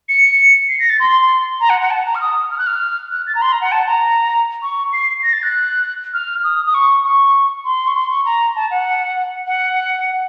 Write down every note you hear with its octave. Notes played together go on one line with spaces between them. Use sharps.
C#7
C7
A#6
A6
C6
A#5
F#5
F#5
A5
A#5
F6
D#6
F6
F#6
F6
F#6
A6
A#5
C6
A#5
F#5
A5
A#5
C#6
C7
A#6
A6
F#6
F6
D#6
D#6
C#6
C#6
C6
C#6
C6
C#6
A#5
A5
F#5
F#5